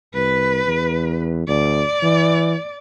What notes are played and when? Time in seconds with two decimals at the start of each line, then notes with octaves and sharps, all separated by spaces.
0.15 C2 B4
0.67 E2
1.48 D2 D5
2.03 E3